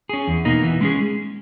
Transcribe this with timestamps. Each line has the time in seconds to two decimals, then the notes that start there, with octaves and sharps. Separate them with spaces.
0.09 C#4 G#4
0.28 E2
0.45 B2 A#3 D#4
0.63 E3
0.81 G#3 C#4 G#4